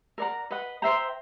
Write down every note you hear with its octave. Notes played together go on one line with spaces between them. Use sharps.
A#4 D5 F#5 A#5
B4 D#5 F#5
C5 E5 G5 A#5